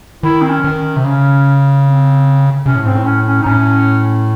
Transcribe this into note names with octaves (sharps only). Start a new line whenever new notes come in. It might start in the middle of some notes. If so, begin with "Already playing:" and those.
D#3 E4
C4
C#4
D#3
C#4
C3
C#3 C#4
C4
C3 C#4
A2
G#2 C4
A2
C#4
C#4
D#4
A2 C#4